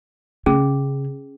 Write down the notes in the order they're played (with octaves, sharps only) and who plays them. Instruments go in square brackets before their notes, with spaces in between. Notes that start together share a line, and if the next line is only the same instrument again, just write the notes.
[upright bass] C#3 [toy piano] C#4 G#4